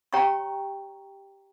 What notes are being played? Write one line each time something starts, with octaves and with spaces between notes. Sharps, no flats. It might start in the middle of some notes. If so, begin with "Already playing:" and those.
G4 C#5 G5 A#5 C#6